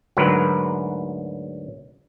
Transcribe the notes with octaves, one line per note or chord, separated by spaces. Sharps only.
D2 G#2 F#3 A#4 B4